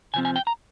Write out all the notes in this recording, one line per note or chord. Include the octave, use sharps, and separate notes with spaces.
C3 F3 C4 G#5
G#5
G5
A#5